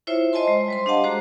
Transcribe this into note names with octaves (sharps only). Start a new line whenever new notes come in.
E4 F4 C5 C#5 E5
C5 D#5 G#5 A5 C6
G#3
G3 C5 C6
D4 G4 D#5 F5 F#5 A5
G#3 F#4 G#4 C5 A#5